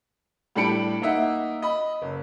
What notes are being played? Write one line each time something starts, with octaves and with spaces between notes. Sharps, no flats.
A2 G3 D4 B5 C#7 D7
A#3 D#4 D#5 E5 F#5
D#5 B5
F#1